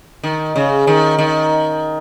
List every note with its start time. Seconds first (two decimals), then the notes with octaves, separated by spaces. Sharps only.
0.23 D#3
0.56 C#3
0.87 D#3
1.19 D#3